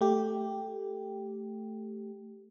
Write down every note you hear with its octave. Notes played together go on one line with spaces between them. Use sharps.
A3 G4